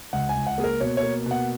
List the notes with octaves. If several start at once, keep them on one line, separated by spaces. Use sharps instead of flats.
C#2 F#5
G#5
C#2
F#5
A#3 G#4
A#4
B2 C#5
C#5
A#3
B2
F#5